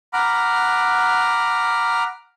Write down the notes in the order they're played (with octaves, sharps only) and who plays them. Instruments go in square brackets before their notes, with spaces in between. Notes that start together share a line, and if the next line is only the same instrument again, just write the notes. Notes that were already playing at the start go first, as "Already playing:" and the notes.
[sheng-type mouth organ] F#5 A#5 B5 D6 F6